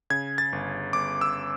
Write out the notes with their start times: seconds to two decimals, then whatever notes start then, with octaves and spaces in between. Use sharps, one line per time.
0.10 C#3 G#6
0.38 A6
0.52 G1
0.93 G1 D6
1.21 E6